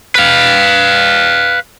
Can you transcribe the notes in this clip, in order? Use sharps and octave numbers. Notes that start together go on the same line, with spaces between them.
B4 F5